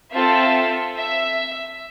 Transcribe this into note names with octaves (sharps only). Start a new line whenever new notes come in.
C4 F4 A4 E5
E5